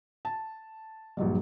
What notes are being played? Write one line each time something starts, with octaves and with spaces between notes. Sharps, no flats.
A5
A#1 G2 F#3 G3